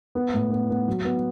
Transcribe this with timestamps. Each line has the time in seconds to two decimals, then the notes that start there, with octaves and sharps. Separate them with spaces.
0.15 B3
0.34 A2
0.51 B3
0.70 B3
0.88 F#3
1.05 B3